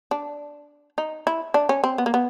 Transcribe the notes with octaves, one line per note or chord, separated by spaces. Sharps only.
D4
D#4
E4
D4
C#4
C4
B3
A#3
B3